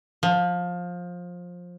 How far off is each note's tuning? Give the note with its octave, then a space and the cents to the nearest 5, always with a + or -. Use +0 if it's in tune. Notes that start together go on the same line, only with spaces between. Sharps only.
F3 +20